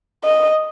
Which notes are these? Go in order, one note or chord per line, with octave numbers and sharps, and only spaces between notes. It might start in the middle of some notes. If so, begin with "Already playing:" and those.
D#5